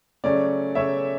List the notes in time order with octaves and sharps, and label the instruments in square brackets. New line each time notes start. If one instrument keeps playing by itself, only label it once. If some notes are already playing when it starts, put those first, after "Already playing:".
[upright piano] C#3 F#3 A3 C#4 D5
C#3 F#3 A3 C#4 C#5 E5